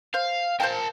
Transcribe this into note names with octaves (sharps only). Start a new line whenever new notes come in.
C5 F5
A#4 C5 F5 G5 A5